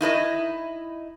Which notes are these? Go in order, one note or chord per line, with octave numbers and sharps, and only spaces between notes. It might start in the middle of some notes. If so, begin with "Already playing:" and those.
D#4 E4 A#4 D#5